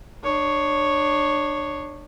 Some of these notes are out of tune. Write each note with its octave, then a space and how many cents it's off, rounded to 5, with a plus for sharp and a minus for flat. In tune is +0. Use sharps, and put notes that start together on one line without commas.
D4 +30 C#5 +0